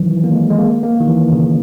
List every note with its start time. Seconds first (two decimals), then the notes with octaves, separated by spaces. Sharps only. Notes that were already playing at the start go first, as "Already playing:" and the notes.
Already playing: D#3 E3 F#3
0.10 E3
0.24 A#3
0.35 G#3
0.50 G#3
0.59 A#3
0.83 A#3
1.01 D#3
1.08 E3
1.32 C#3